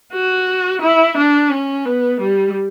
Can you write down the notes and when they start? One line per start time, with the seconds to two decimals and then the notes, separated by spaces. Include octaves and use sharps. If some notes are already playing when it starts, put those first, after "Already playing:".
0.13 F#4
0.81 E4
1.17 D4
1.51 C#4
1.85 B3
2.20 G3